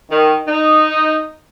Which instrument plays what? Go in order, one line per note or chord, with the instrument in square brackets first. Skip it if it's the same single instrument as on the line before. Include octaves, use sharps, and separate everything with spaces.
[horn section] D#3
D#4